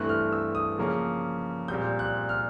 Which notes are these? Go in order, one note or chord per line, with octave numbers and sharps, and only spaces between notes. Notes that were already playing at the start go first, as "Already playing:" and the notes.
Already playing: G2 E3 A3 C4 F#6
F6
E6
D#6
C#3 F3 A#3 C#4
A#2 G3 C4 G6
F#6
F6